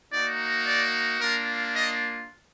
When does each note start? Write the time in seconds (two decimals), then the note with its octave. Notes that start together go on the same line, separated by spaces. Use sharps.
0.13 A#3 D#4 F#4 D5
0.66 D5
1.20 A#3 D4 F4 A#4
1.75 D#5